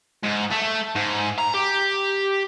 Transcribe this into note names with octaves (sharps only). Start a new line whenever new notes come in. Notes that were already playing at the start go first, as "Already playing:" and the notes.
G#2
A3
G#2
A#5
G4